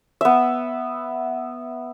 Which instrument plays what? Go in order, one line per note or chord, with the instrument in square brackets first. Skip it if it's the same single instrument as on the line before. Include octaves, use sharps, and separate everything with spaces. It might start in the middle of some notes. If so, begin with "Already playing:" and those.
[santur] B3 E5